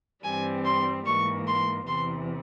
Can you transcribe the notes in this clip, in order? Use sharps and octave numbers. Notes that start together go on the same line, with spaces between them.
G2 E3 G3 C4 G#5
C6
G#2 E3 A#3 C#6
C6
E2 C3 E3 C6